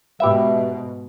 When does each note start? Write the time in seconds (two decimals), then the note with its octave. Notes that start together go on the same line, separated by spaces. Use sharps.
0.20 G#2 B2 G4 B4 E5